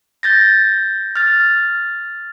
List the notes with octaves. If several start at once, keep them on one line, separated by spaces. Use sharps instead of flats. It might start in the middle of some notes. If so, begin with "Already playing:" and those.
G6 A6 A#6
F6 A6